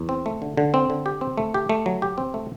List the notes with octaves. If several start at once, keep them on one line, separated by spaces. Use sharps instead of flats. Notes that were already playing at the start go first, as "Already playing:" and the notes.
Already playing: E2
C4
A3
D3
D3
C4
D3
G4
C4
A3
G4
A3
F#3
G4
C4
A3